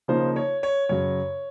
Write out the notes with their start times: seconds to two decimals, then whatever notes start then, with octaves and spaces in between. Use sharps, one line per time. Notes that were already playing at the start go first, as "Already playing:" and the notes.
0.08 C#3 F3 A#3 D#4 C5
0.36 C#5
0.63 C#5
0.89 F#2 C#3 F#3 C#5